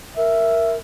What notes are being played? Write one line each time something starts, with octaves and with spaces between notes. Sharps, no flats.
A#4 E5